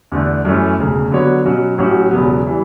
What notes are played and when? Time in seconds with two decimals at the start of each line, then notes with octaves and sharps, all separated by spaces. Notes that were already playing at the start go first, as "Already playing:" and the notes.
0.12 E2 D3 A3
0.45 F#2 E3 A3 C#4
0.78 E1 D2 C#3
1.11 D3 F#3 B3 F#4 C#5
1.45 B2 F#3 C#4 F#4
1.78 A1 A2 F#3 C#4 F#4
2.11 E1 E2 C#3 F#3 B3
2.47 E3 G3